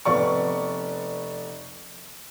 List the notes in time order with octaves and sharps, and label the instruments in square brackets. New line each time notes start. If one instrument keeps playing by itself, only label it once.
[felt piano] F1 B3 D5 C#6